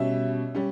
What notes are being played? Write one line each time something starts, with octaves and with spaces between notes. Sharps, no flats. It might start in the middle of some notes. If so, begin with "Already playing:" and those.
Already playing: B2 G3 C#4 E5
G3 C#4